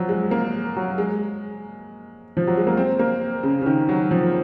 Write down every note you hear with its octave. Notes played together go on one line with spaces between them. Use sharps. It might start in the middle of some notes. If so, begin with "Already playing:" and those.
Already playing: F3 F#3
G#3
A#3
F#3
G#3
F3
F#3
G#3
A#3
C4
A#3
C#3
C#3
D#3
F#3
F3